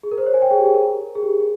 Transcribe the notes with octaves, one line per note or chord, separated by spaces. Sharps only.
G#4
A#4
C5
C#5
G#5
G5
G#4
G4
G#4
A#4
G#4
G4
G#4